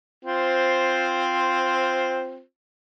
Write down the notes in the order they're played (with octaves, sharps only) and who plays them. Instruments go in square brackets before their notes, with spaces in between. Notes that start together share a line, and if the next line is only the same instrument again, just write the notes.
[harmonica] C4 F4 C5